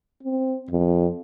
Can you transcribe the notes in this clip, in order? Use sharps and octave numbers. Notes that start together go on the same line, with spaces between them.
C4
F2